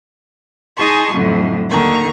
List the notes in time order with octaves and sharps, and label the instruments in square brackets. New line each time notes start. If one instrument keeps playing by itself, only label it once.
[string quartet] D#4 G#4 G#5 A5 C6 C#6
F2 A2 D3 F#3
D#2 D3 D#3 A#5 C#6